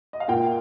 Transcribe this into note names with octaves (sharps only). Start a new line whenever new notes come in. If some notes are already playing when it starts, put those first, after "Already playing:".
D#5
F5
A#2 A#3 F4 G5